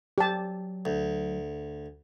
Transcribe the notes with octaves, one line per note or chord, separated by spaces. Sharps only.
F#3 G4 A5
D2